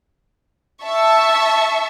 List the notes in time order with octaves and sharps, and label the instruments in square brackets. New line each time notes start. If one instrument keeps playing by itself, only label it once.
[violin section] E5 A5 C#6